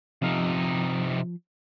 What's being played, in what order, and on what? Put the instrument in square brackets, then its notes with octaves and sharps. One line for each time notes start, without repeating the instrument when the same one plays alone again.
[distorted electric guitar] C3 D#4 [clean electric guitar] F3 F5